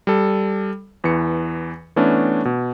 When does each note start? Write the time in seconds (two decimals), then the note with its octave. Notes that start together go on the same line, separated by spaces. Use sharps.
0.07 G3 A4
1.04 E2 E3 C#7
1.96 E3 A3 B3 C#4 D4
2.45 B2